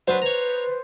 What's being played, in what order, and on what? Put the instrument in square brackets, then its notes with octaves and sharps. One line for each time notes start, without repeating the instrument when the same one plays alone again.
[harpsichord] F#3 D4 B4 [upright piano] C5
[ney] B4 [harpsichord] C#5 A#5